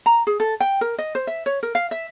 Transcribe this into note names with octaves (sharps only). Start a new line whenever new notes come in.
A#5
G#4
A4
G5
A#4
D#5
C5
E5
C#5
A#4
F5
E5